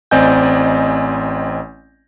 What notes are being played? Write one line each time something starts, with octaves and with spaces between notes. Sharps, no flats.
A1 C4 D5 D#5 G#5 G6